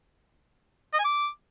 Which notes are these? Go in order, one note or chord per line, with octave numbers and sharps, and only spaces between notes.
D#5
G#5
D6